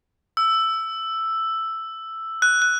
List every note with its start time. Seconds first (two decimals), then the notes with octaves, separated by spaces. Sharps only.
0.37 E6
2.42 F#6
2.62 F#6